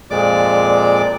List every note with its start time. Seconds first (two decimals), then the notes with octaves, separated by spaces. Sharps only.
0.11 F2 A#2 G#3 D5 D6